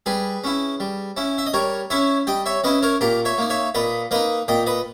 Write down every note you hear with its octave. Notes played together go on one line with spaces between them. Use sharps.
G3 G#4 B4
C#4 E4
G3
C#4 E4
E5
D#5
G3 A#4 C#5
C#4 E4 C#5 E5
G3 D#5 G5
C#5 E5
C#4 E4 B4 D#5
A#4 C#5
A#2 G4 A#4
C#5 E5
A#3 D#4
C#5 E5
A#2 B4 D#5
A#3 D#4 B4 D#5
A#2 D#5 G5
B4 D#5